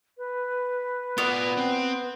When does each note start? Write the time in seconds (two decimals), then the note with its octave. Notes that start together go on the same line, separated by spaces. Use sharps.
0.18 B4
1.18 B3 F4 D5
1.57 C4